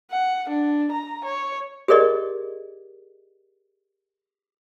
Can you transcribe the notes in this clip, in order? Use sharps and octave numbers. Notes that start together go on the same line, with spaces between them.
F#5
D4
A#5
C#5
G4 G#4 A#4 D5 D#5